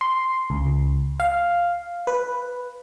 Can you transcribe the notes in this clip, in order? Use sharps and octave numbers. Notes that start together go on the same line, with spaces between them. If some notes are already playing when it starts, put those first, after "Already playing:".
C6
C#2
F5
B4